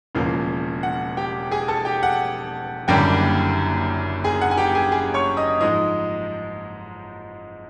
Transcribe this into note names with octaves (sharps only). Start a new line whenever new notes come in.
E1 E2 C#3 F3 A#3 F5
F#5
G4 G5
G#4 G#5
A4 A5
G4 G5
F#5
F#1 F#2 D3 G3 A#3 G4 G5
G#4 G#5
F#5
G#5
G4 G5
G#4 G#5
G#4 G#5
C#5 C#6
D#5 D#6
G#2 F3 G#3 D#5 D#6